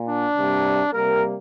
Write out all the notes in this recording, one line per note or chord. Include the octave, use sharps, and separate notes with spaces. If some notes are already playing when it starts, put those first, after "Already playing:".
Already playing: A#2
D4
C3 G3 A#3
C3 G3 A#3 A#4